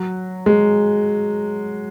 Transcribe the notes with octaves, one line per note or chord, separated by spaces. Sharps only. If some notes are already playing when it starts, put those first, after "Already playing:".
Already playing: F#3
G#3